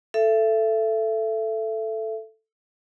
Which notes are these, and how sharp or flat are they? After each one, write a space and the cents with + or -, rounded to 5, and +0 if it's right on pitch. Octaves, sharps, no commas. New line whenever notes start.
A4 +0 E5 +30